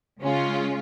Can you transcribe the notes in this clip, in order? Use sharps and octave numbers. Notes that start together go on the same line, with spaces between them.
C#3 G#3 C#4 F4